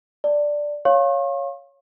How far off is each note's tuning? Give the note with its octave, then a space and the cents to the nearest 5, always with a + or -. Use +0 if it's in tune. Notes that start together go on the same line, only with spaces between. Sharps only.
D5 +0 A5 +20
C#5 +0 F5 +0 C#6 -45